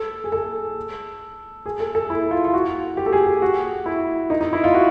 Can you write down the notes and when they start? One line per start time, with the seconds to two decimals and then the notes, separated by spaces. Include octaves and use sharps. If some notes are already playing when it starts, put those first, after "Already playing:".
Already playing: A4
0.24 G#4
0.32 A4
1.66 G#4
1.80 A4
1.95 A4
2.10 E4
2.31 F4
2.45 F4
2.54 F#4
2.97 G4
3.06 A4
3.13 G#4
3.27 G4
3.42 F#4
3.86 E4
4.30 D#4
4.41 D#4
4.53 E4
4.64 F4
4.74 F#4